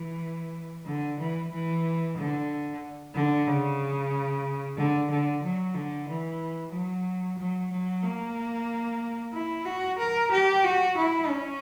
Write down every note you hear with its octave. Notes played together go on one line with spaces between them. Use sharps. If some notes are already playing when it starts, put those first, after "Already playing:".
Already playing: E3
D3
E3
E3
D3
D3
C#3
D3
D3
F#3
D3
E3
F#3
F#3
F#3
A#3
E4
F#4
A#4
G4
F#4
E4
C#4